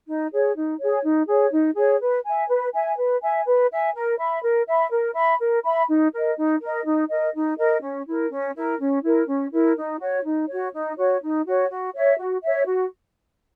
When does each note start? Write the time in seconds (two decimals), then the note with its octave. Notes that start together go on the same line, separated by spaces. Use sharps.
0.07 D#4
0.32 G#4 C#5
0.56 D#4
0.80 G#4 C#5
1.03 D#4
1.28 G#4 C#5
1.52 D#4
1.76 G#4 C#5
2.01 B4
2.25 E5 G#5
2.49 B4
2.73 E5 G#5
2.97 B4
3.22 E5 G#5
3.46 B4
3.71 E5 G#5
3.95 A#4
4.19 E5 B5
4.42 A#4
4.68 E5 B5
4.91 A#4
5.15 E5 B5
5.40 A#4
5.64 E5 B5
5.89 D#4
6.12 A#4 D#5
6.37 D#4
6.61 A#4 D#5
6.85 D#4
7.10 A#4 D#5
7.34 D#4
7.58 A#4 D#5
7.82 C#4
8.07 E4 A#4
8.31 C#4
8.55 E4 A#4
8.79 C#4
9.03 E4 A#4
9.28 C#4
9.52 E4 A#4
9.77 D#4
10.00 F#4 C#5
10.25 D#4
10.48 F#4 C#5
10.74 D#4
10.98 F#4 C#5
11.22 D#4
11.46 F#4 C#5
11.70 F#4
11.94 C#5 E5
12.18 F#4
12.43 C#5 E5
12.66 F#4